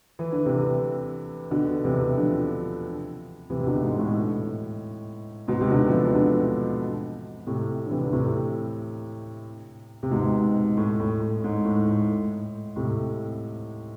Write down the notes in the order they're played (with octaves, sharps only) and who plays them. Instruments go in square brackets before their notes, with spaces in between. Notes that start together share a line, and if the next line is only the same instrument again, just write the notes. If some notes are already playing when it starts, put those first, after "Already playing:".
[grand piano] E3
D3
C3 E3
B2 D3
C3 E3
D3 F3
C3 E3
C3
B2 D3
G#2
A2
G#2 B2
C3
B2 D3
F3
C3 E3
B2 D3
A2 C3
D3
C3 E3
D3
A2 C3
C3
G#2 B2
A2
A2
A2
G#2
A2
A2
A2 C3